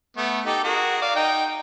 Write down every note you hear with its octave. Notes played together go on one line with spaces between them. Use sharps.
A3 B3
D#4 G4 A4
F#4 G#4 A#4
D5 F5
D#4 G5